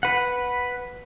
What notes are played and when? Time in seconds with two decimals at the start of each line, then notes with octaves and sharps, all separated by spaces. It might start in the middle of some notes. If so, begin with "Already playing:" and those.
0.03 B4 F#5